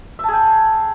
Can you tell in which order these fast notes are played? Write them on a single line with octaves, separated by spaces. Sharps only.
E5 A5 G#4 G5